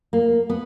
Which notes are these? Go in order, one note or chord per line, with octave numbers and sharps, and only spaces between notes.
A#3
B3